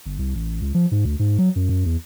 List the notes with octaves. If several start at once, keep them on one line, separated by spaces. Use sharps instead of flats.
G1
C2
A1
C#2
F3
G#2
D2
G#2
F#3
F#2
F#2
E2